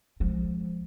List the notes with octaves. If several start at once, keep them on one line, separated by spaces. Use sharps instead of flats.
F3 G#3